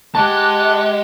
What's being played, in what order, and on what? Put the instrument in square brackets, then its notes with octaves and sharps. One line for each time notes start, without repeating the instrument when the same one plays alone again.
[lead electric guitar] G#3 [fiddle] G4 F#5 [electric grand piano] A5 [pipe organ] D6 F#6